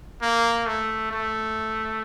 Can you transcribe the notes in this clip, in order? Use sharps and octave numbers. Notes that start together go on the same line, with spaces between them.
A#3
A3
A3